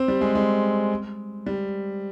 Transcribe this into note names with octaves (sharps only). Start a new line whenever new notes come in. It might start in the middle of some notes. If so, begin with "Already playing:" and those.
Already playing: C4
G3
G#3
G#3
G3